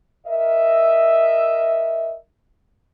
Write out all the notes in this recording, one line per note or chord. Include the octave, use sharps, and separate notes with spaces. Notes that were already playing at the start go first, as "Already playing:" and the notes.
A#4 D#5 E5